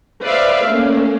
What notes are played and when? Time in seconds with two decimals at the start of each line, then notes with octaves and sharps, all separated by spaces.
0.22 B4 C5 D5 E5 F5
0.64 A3 A#3 C#4